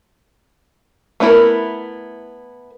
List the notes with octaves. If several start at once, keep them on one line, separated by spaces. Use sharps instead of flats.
A3 B3 D4 E4 A#4